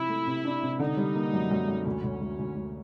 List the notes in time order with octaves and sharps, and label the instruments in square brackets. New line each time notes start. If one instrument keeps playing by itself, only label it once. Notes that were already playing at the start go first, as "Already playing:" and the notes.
Already playing: [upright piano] C3 F3 [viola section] E4
[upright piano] A3
C3
D4
C3
[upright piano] D3 [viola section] D#4
[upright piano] G3
A#3
F#2
F#2
F#2
[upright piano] D2 [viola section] C#4
[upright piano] D2
D2
D2
D2